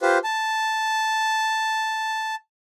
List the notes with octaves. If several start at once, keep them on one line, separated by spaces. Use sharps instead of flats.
F4 G4 B4 C5
A5